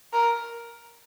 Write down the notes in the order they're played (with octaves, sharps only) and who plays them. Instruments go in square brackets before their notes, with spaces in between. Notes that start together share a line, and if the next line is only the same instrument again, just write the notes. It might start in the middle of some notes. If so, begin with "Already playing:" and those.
[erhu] A#4